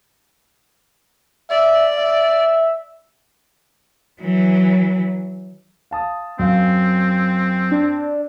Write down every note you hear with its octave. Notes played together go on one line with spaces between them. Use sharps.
D5 E5
E5
E3 F#3
F5 A5 D#6
F#2 C4 F5
D4